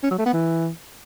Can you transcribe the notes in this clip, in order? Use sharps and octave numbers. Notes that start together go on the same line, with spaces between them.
C#4
F#3
A3
B3
E3